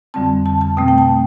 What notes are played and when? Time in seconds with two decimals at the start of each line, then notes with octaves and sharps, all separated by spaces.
0.14 F2 D3 G3 C4 A5
0.46 A5
0.61 A5
0.77 B2 A3 C4 G5
0.88 G5
0.98 A5